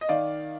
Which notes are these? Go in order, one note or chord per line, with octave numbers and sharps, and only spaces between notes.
D#5
D#3 D5 F5